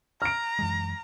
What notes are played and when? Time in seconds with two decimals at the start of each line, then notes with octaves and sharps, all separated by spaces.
0.22 A#5 F6 D7
0.59 F#2 E3 G#3